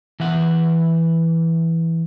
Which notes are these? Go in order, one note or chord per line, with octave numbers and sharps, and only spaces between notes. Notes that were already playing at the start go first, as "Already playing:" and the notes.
E3 E5 F#5